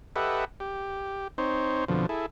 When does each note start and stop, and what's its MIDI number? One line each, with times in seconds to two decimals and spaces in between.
0.16 0.45 67
0.16 0.45 69
0.16 0.45 71
0.16 0.45 75
0.16 0.45 76
0.16 0.45 78
0.60 1.28 67
1.38 1.85 60
1.38 1.85 63
1.38 1.85 72
1.38 1.85 73
1.88 2.06 41
1.88 2.06 47
1.88 2.06 50
1.88 2.06 53
2.09 2.26 64
2.09 2.26 68
2.09 2.26 69